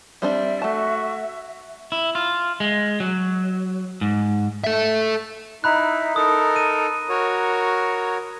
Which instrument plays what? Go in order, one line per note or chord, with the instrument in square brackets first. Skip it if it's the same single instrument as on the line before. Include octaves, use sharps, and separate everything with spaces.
[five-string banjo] G3 C4 D4 [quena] E5
[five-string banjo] A3 A5 [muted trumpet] F#4
[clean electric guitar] E4
F4
G#3
F#3
G#2
[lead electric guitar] A4 E5
[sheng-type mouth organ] D#4 E4 [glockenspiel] A#5 B5 F#6
[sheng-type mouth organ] D#4 A4 A#4 [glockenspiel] D#6
[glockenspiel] D#7
[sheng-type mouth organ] F#4 A#4 C#5